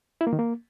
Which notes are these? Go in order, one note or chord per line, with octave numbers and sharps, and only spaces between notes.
E4
A#3
D#3
A#3